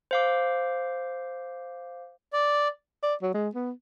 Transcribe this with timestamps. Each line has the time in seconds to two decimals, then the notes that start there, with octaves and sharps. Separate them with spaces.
0.11 C5 F5 D6
2.33 D5
3.03 D5
3.22 F#3
3.34 G#3
3.55 B3